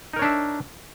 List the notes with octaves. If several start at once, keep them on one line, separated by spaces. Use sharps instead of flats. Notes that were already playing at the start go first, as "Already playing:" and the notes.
D4 D#4 A#4 C#5 E5